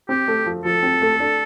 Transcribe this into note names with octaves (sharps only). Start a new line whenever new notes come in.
C4 G4
A3
F3
F3 A4
C4
A3
D4